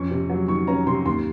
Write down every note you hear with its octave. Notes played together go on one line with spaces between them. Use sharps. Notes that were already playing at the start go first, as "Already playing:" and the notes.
Already playing: F2 C#4 C#6
C3
F#3
D#3 C#6
C#4 A#5
C3 C6
D#2 C6